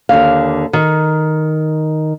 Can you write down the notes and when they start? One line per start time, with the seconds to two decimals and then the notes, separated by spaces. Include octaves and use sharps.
0.09 D#2 D3 F5
0.73 D#3